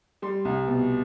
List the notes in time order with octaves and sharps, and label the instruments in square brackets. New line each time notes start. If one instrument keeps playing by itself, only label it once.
[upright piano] G3 C6
C2
B2